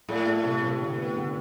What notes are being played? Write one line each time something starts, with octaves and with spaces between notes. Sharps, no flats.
A2 A3
A3
C3
C3
D3
B3
D3